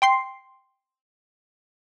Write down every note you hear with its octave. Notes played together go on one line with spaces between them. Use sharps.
G5 C6 C7